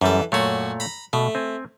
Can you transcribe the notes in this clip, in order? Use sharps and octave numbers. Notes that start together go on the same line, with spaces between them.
F#2 E3 G3 A4
F#2 A#2 A3 F#4 C#5
A#5 B5
B2 A3
C4 G#5